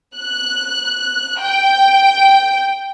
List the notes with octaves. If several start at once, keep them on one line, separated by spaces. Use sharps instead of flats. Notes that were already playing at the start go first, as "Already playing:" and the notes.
F#6
G5